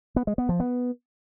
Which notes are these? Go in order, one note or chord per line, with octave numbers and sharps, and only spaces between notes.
B3
G#3
B3
F3
B3